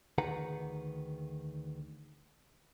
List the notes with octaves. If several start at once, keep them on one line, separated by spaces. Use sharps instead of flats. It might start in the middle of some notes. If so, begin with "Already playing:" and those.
D2 D#3 G#4 B4 F#5 A#5